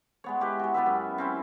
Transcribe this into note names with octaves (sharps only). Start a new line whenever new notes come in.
G#3 B3 C#5
E4 G4 B4
G#3 F#4
B3 G4 B4 E5
F#2
C4 C#4 E4